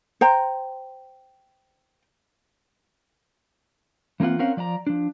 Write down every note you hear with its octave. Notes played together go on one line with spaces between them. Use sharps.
C5 G5 A#5
E3 A#3 C4 F4 F#5
C4 C#4 A#4 F5 F#5
F3 D5 F#5 A#5
F3 D4